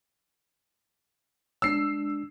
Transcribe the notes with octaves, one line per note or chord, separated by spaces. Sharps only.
G#3 D4 E6 C7